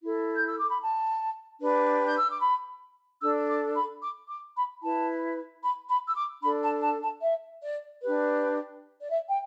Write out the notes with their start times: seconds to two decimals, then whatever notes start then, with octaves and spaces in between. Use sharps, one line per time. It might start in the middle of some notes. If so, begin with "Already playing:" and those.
0.02 E4 A4
0.36 G6
0.47 E6
0.58 D6
0.70 B5
0.82 A5
1.61 D4 G4 B4
2.05 G6
2.18 E6
2.29 D6
2.41 B5
3.21 D4 A4 E6
3.49 D6
3.75 B5
4.02 D6
4.29 D6
4.55 B5
4.82 E4 B4 A5
5.63 B5
5.89 B5
6.07 E6
6.16 D6
6.43 D4 A4 B5
6.63 A5
6.82 A5
7.02 A5
7.22 E5
7.63 D5
8.02 D4 G4 B4
9.01 D5
9.10 E5
9.28 G5